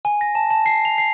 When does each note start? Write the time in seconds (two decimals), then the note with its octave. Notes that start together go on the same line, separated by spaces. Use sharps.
0.05 G#5
0.21 A#6
0.35 A5
0.50 A5
0.66 C7
0.85 F7
0.98 C7